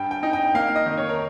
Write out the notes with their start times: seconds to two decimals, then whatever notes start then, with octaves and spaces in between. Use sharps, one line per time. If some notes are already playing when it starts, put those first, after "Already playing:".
Already playing: G2 G5
0.11 G5
0.23 D#4
0.33 G5
0.54 A#3 F5
0.76 D#5
0.86 D#3
0.97 C#5
1.09 A#4